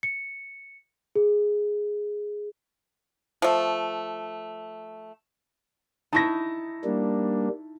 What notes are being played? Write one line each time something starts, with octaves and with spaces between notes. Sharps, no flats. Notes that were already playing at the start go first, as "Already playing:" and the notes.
C#7
G#4
F3 A3
D#4 E4 A5 C#6 A#6
G3 A#3 D4